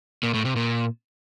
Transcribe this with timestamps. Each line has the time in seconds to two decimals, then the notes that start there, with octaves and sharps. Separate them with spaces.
0.23 A#2
0.34 A2
0.45 C3
0.56 A#2